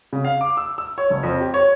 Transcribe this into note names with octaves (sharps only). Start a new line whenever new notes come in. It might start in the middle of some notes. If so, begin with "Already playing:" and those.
C#3
F5
D6
E6
E6
C#5
F#1
F2
G4
C#5